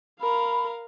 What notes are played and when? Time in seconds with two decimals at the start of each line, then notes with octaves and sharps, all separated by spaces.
0.21 A#4 F5 B5